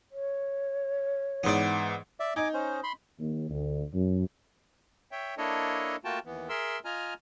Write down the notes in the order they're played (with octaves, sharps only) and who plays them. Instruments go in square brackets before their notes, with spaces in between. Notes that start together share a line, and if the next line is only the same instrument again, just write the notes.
[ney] C#5
[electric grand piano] G#2 E3 [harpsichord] B3 D5
[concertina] D5 E5
[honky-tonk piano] D#4 D#5 [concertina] G#5 D6
[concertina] C#4 C5
B5 C6
[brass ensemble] D#2
D2
F#2
[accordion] C#5 E5 G5
A#3 D4 E4 A4 C#5 D#5
A3 A#3 F4 F#4 G5 A5
D#2 E3 B3
G#4 A#4 E5 C6 E6
F4 D#5 G#5 A#5 F6